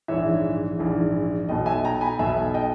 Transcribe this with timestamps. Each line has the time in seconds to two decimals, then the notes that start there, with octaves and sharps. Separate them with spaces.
0.08 A#1 G#2 E3 C#5 E5
0.79 A#1 G#2 E3
1.48 B1 B2 D#5 G5
1.66 E5 G#5
1.85 G5 A#5
2.01 G#5 B5
2.19 B1 B2 E5 G#5
2.54 D#5 G5